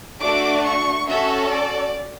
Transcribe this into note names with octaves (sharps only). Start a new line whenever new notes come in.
A3 D4 F#4 D6
C#6
C#4 F#4 A4 E5
D5